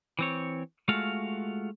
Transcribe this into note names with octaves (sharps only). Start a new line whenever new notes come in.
E3 C4 C#5
G#3 A3 F4 F#4 F5